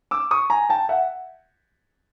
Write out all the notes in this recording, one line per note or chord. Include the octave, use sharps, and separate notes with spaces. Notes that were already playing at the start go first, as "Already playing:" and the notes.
D6 E6
C#6 D#6
G#5 A#5
G5 A5
E5 F#5